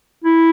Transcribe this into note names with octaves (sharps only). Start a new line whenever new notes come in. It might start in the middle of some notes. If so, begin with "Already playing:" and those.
E4